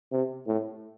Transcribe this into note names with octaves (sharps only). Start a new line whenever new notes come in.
C3
A2